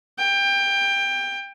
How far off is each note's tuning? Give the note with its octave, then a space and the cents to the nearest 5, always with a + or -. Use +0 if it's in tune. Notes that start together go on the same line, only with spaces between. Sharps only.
G5 +20